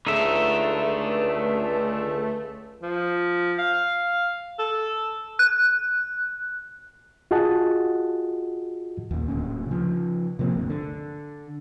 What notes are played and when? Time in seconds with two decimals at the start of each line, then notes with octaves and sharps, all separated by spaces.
0.07 C#2 D3 A3 D#4 E5
2.83 F3
3.59 F5
4.59 A4
5.39 F#6
7.31 F4 F#4 G#4 D#5 F#5 A5
9.11 D#2 A#2
9.28 D1 D2 A#2 C#4
9.67 C#3 F3
10.39 C3 F3 A#3 C4
10.56 G1 D2
10.70 D3